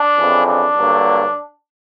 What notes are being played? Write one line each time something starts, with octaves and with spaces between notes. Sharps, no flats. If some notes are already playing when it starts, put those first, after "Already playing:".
Already playing: D4
F2 C#3 E3
D4
G2 D3 F#3 A#3